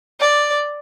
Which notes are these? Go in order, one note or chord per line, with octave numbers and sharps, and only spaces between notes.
D5